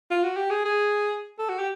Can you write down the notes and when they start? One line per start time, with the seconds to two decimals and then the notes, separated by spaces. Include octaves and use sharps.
0.11 F4
0.23 F#4
0.37 G4
0.50 G#4
0.65 G#4
1.39 A4
1.49 F#4
1.59 G4